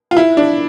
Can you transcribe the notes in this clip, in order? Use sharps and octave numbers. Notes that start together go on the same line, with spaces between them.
F4
E4
D4